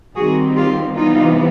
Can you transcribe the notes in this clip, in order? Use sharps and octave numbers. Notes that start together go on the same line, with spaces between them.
D#3 G3 C4 F#4 G#4
F4 G4
C3 E3 G3 B3 D#4 F4